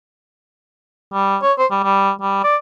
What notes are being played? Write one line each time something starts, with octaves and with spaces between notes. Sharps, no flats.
G3
C#5
C5
G3
G3
G3
D5